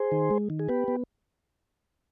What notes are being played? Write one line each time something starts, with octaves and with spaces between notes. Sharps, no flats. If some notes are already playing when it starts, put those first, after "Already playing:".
Already playing: G#4 C5
D#3
G#3
D#3
G#4
B3 G4 B4
B3